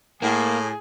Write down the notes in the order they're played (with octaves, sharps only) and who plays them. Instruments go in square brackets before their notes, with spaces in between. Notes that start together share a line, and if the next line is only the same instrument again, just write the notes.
[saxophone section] A2 [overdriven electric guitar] A#3 [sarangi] G#4